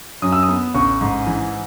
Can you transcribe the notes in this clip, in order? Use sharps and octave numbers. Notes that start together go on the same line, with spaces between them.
F#2 D#6
E6
D#6
B3
A1 C#6
G#2
E3